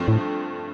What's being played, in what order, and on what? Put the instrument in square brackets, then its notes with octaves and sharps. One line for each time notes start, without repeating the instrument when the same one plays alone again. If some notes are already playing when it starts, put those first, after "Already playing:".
Already playing: [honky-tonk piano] G2 F3 A3 C4
[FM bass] A2